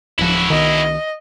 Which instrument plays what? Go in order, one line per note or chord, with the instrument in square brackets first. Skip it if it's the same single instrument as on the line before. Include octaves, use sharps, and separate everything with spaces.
[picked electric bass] D1 F3 [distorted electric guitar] E4 F#4
[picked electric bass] C2 D#3 [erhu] D#5